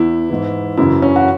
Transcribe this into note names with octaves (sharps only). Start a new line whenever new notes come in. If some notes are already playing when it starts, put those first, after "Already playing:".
Already playing: E2 E3 E4
G#2 E3
F#2 C#3 E3 E4
C#4
F#4